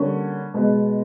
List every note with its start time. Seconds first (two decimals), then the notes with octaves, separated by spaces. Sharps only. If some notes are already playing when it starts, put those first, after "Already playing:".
Already playing: D3 G3 A#3 C#4
0.54 B2 G#3 B3